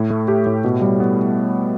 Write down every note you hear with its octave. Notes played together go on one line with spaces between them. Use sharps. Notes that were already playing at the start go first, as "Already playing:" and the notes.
Already playing: A2
A3
G4
A2
B2
G3
B3